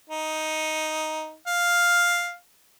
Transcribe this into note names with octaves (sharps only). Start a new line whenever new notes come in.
D#4
F5